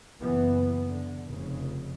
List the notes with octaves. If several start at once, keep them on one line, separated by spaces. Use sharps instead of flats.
F#1 E3 B3
D3
F1 C#3